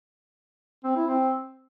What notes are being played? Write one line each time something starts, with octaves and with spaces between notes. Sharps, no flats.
C4
E4
C4